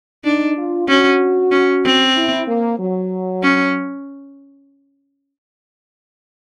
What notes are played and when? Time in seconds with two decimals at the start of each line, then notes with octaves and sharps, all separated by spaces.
0.24 D4 D#4
0.57 F4
0.88 C#4 F#4
1.52 C#4
1.85 C4
2.16 E4
2.47 A#3
2.79 F#3
3.43 C#4